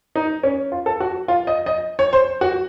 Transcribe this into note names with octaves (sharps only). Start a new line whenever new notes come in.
D#4
C#4
F4
A4
F#4
F4
D#5
D#5
C#5
C5
F#4